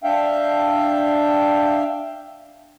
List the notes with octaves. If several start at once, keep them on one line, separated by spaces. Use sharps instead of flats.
D4 E5 F5 G5